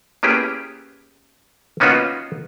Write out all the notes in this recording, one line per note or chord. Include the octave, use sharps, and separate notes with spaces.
A#3 B3 C#4 E4 G4 G#4
A#3 B3 C#4 D#4 F4 F#4